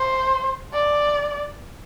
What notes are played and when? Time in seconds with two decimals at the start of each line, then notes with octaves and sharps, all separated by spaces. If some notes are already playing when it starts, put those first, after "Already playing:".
Already playing: C5
0.73 D5